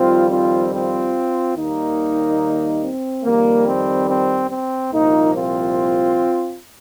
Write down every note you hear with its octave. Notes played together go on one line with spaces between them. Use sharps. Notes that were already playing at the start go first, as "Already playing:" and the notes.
Already playing: F2 D#3 G3 C4 F4
C4 F4
C4 F4
D#2 D#3 G3 A#3 D#4
C4
F2 D#3 G3 A#3
C4
C4
C4
C2 A#2 F3 A#3 D#4
C4 F4